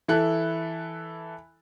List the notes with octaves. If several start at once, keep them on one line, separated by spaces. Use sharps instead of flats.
E3 E4 A4 F#6